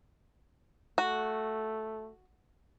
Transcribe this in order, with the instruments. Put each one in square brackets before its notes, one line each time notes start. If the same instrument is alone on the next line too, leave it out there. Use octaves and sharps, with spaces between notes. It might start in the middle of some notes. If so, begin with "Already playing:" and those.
[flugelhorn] A3 [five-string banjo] F#4